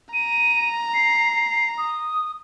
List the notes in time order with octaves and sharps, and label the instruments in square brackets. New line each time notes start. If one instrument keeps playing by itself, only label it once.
[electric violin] A#5 [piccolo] D#7
[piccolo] C7
D#6